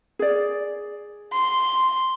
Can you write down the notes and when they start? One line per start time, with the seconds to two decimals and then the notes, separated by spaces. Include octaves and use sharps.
0.19 G#4 D5
1.33 C6